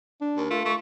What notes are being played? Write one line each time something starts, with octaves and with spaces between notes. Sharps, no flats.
D4
D#2 A#4
A3 F4
A3 C#6